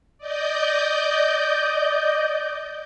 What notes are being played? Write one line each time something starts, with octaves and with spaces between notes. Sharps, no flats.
D5 D#5 G6